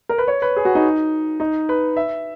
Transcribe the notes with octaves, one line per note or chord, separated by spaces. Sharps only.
A#4
B4
C#5
B4
G#4
F#4
D#4
D#4
B4
E5